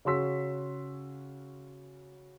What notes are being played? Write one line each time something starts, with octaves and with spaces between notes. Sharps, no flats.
C#3 C#4 F#4 C6 E6 B6